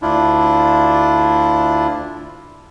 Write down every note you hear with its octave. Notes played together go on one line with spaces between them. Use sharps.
D2 D4 E4 F4